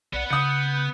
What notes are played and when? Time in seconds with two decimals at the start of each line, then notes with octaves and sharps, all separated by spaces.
0.13 B1 B3 D5 F#5
0.30 C#3 D#6 G6 C#7